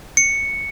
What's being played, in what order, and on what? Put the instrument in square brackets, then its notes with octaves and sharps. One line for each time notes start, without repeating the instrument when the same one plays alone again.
[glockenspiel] C#7